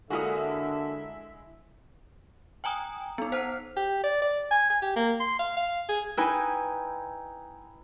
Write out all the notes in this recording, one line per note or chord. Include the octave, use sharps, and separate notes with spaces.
D3 G#3 A#3 E4 F#4 E5 D#6
G5 G#5 A#5 D#6
B3 D#4
C5 F#5 F6
G4
D5
D5
G#5
G#5
G4
A#3
C6
F5
F5
G#4
D#4 E4 B4 G5 G#5